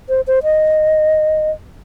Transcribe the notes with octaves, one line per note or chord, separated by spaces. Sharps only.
C5
C5
D#5